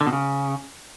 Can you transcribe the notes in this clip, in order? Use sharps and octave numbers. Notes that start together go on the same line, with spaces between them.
D3
B2
C#3